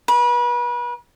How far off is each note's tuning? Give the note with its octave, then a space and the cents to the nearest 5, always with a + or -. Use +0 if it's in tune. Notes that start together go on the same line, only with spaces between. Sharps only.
B4 -35